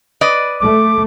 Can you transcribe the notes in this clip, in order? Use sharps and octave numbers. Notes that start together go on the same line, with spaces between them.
B4 D5 D#5
A3 D6